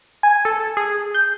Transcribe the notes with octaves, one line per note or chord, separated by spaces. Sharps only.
G#5
A4
G#4
G6